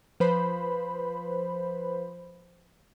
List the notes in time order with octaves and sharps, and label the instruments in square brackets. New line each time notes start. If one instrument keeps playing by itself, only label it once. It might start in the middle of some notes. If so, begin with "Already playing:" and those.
[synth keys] F3 B4 C5 B5